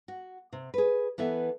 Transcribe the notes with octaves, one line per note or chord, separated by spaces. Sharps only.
F#4
C3
G#4 B4
E3 B3 A4 E5